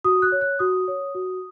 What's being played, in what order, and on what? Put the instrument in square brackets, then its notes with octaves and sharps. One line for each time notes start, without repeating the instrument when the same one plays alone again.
[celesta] F#4 D#6
F#6
C#5
F#6
F#4 D#6
C#5
F#4